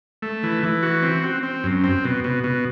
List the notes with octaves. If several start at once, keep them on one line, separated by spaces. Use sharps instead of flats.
A3
E3
E3
F#4
C4
C4
C4
F#2
C4
B2
B2
B2